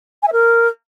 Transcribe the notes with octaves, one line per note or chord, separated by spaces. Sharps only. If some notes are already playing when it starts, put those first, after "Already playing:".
G#5
E5
A#4